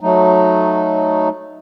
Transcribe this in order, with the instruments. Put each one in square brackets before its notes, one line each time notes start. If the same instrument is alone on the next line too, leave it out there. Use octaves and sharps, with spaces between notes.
[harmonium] F#3 A3 D#4